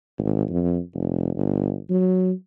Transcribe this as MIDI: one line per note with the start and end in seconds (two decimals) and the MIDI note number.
0.18 0.44 32
0.49 0.79 41
0.94 1.32 29
1.35 1.78 31
1.90 2.32 54